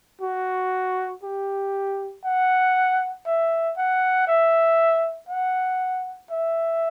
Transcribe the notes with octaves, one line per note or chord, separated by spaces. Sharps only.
F#4
G4
F#5
E5
F#5
E5
F#5
E5